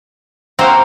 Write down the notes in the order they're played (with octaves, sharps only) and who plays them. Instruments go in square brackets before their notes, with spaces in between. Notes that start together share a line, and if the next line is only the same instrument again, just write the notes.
[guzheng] A#3 F#4 G4 [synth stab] C4 C5 F5